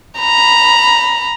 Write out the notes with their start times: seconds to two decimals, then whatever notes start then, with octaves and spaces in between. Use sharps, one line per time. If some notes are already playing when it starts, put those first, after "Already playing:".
0.19 A#5 B5